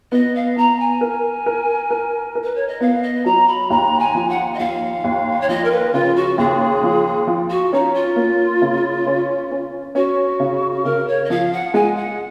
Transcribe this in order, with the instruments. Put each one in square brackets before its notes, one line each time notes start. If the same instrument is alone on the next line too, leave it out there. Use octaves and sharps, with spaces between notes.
[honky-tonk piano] B3 [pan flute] D#5
[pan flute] F5
[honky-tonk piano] B3 [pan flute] A#5
[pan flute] G#5
[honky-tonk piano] A#4
A#4
A#4
A#4
[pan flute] B4
C#5
D#5
[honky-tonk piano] B3 [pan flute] F5
[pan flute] D#5
[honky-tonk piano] F#3 [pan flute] A#5
[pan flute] B5
[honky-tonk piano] D#2 [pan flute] A#5
[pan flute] G#5
[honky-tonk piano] F3
[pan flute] F#5
D#5
[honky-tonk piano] D#2 [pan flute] F5
[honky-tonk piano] D#2
[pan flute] C#5
[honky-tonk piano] F3 [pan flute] D#5
[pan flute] A#4
B4
[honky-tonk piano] C#3 [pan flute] F4
[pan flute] F#4
[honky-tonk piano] D#2 [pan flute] G#4
[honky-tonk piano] F3
F3
[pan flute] F#4
[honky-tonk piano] C#4 [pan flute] D#4
[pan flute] F4
[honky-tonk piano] A#3
C#3
C#4
C#4
[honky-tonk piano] C#4 [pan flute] F#4
[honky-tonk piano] C#3
[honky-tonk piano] C#3 [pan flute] A#4
[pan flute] C#5
D#5
[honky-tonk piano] F3 [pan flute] F5
[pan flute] F#5
[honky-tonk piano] G#3 [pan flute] G#5
[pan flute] F#5